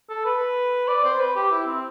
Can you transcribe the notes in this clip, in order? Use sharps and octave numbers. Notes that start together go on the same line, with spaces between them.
A4
B4
D5
C5
B4
G4
E4
C4